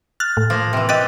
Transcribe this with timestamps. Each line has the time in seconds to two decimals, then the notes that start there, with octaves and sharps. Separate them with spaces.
0.20 F6 F#6 A6
0.37 A2
0.50 F3 A#3
0.73 C3 E3
0.89 G4 D#5 F#6 A6